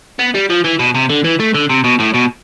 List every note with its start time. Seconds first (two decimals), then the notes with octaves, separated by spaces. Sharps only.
0.19 B3
0.35 G3
0.50 F3
0.64 E3
0.79 B2
0.95 C3
1.09 D3
1.24 E3
1.40 A3
1.55 D3
1.70 C3
1.84 B2
2.00 A2
2.15 B2